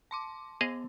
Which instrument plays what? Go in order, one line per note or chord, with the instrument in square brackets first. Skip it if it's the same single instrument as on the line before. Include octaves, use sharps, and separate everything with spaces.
[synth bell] A5 C6 D6
[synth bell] B3 [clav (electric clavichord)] G#4 D#5 F5